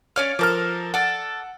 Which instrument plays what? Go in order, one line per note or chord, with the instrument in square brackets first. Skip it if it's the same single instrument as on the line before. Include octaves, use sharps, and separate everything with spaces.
[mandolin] C#4 D5 F5 [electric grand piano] C#5 F6
[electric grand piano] F3 A#4 F6 [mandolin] A4 D6
[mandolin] A4 D5 [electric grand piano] F#5